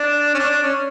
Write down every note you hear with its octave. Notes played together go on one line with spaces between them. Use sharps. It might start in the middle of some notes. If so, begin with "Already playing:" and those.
Already playing: D4
C#4
D4
D4
C#4